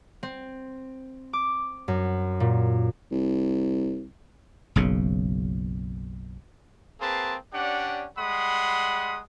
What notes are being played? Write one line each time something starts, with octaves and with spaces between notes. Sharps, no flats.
C4
D6
F#2
A#2
C2
F#1 B1 C#3
A#3 C4 G#4 B4 A5 C6
C#4 D4 G4 D5 F#5
G3 G#3 F#5 B5 C6 D#6